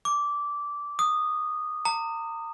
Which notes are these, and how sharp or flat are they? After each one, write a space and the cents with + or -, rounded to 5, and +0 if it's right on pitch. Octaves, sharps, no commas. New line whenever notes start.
D6 -15
D#6 -15
A#5 -35